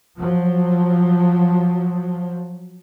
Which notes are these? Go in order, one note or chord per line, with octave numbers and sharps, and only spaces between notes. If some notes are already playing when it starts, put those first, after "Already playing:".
F3 F#3